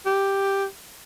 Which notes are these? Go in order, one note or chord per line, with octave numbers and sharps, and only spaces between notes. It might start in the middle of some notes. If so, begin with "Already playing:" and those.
G4